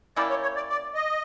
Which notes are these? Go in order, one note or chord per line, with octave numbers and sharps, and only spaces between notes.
A#3 C#4 E4 G4 D5
C#5
C#5
D5
D5
D#5